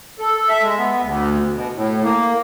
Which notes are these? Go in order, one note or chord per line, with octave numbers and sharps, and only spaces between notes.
A4
E5
G#3
B3
D2
B2
A2
A#3